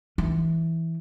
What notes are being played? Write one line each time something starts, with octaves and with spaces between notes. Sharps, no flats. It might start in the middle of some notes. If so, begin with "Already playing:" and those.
E3